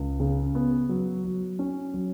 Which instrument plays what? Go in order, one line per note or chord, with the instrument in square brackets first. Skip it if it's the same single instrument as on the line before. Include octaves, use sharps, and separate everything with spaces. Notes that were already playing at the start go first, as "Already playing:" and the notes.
Already playing: [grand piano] C#2
C#3
B3
F#3
F#3
C#4
F#3